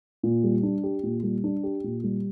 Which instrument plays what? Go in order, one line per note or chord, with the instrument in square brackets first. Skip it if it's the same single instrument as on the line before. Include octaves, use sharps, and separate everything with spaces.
[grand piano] A#2
G3
D4
G4
A#2
G3
D4
G4
A#2
G3